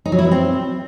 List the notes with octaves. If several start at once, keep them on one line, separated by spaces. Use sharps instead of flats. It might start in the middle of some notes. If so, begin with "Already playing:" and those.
D#4
F#3
E4
B3
C4